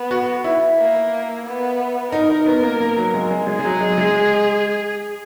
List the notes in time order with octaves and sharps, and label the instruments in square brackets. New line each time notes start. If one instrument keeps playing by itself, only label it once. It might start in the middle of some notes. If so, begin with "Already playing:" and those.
Already playing: [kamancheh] B3
[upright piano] F#4
E4
[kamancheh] A#3
B3
[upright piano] D#4 [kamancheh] A#4
[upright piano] D#4
B3
A#3
A#3
F#3
G#3
G#3
[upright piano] G#3 [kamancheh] G#4
[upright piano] G#3
F#3
G#3
G#3